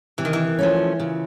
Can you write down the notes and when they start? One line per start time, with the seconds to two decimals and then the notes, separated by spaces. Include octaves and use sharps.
0.18 C3 E3
0.25 D#3
0.33 E3
0.59 F3 A3 C#4
1.00 C#3